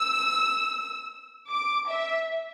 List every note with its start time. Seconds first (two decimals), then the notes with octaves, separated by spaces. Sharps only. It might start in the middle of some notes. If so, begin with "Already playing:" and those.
Already playing: E6
1.51 D6
1.89 E5